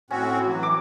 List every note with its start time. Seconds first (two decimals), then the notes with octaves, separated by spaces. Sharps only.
0.11 A2 C4 C#4 F#4
0.46 E3 F#3
0.63 D6